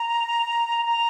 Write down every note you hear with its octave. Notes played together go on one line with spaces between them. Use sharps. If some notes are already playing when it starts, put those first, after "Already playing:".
Already playing: A#5
A#5